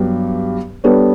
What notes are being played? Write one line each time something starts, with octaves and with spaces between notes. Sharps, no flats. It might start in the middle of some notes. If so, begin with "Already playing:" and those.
Already playing: G2 F#3 B3 G4
G3 B3 D4 A4 C#5